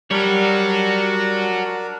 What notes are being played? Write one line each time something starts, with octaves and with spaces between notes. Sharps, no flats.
G3 D4 F#4 A#4 C#5